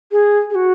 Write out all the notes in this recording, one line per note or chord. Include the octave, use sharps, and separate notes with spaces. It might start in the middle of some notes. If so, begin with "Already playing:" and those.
G#4
G#4
F#4